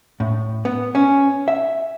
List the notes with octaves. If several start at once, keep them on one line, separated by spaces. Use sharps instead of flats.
A2
B3
C#4
E5